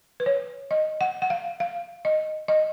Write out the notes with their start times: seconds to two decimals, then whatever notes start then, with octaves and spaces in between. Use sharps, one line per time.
0.20 B4
0.26 C#5
0.71 D#5
1.01 F#5
1.22 F#5
1.30 F5
1.60 F5
2.05 D#5
2.48 D#5